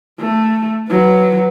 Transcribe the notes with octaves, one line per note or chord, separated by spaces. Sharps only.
A3
F#3 B4